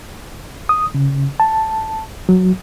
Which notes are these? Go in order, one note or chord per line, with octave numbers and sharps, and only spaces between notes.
D#6
C#3
A5
F#3